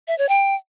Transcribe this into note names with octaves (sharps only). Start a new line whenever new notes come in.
E5
C#5
G5